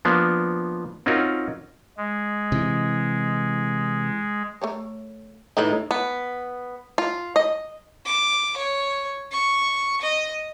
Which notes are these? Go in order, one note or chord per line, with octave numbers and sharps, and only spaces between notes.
F3 A#3 B3 D4
C4 C#4 D#4 F4 F#4 A#4
G#3
C3 E3
A3 A#4 C#5
A2 D#3 D#4 E4 B4
B3
F4
D#5
D6
C#5
C#6
D#5